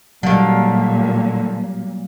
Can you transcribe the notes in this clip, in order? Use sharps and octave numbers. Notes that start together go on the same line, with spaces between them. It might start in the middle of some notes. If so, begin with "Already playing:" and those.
A#2 D3 D#3 F#3 G3 F5